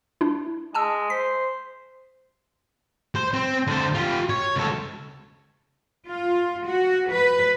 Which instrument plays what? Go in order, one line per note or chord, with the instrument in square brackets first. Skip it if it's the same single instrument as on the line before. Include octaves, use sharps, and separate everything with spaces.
[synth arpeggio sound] D4 E4
[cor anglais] G#3 [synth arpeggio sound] G#5 A5 E6
[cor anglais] C5 [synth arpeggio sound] B6
[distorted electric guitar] C5
C4
D3 C5
F4 G4
C#5
C#2 A4
[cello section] F4
F#4
B4